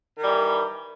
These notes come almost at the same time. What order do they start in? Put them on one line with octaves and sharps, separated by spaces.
D#3 G3 E3